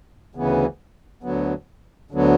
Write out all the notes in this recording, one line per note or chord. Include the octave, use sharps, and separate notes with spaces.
D2 C#3 E3 B3
D2 D3 F#3 B3
D2 D3 F#3 B3